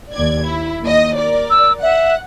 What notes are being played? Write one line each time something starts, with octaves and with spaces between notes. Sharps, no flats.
D#2 D5 G#6
E4
D#2 D#5
A#4 D5
E6
E5 F#5